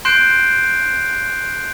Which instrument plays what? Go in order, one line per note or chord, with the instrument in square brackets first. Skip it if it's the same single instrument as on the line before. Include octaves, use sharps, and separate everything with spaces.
[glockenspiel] C6 F#6 G6 C7 D7 E7